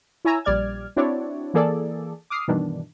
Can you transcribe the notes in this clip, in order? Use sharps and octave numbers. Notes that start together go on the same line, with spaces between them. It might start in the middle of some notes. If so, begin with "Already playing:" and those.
E4 C#5 G#5 A#5 E6
A#1 G3 D5 F6 G#6
C4 D4 E4 F#4 C#5 D5
E3 A#3 G#4 A4 D5
D6 D#6 F6 C7
G2 B2 D#3 E3 D4